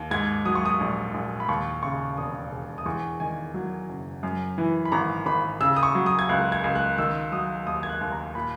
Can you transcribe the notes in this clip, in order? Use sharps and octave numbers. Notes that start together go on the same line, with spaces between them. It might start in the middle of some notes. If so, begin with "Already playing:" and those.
Already playing: D#2
G#2 G#6
F#3 D#6
C#6
D#6
A#1
A#1
B5
D#2 C#6
C#3 C#6
E1 D#6
E1
D#6
E2 C#6
D#3 G#5
F#3
F#1
F#2
E3
B5
G#1 A#5
G#1 B5
C#3 E6
D#6
C#6
F#3
D#6
G#6
C#2 F#6
G#6
C#2
F#6
D#3 E6
F#3 D#6
D#2 D#6
G#6
F#6
D#2
A#5
A#2 B5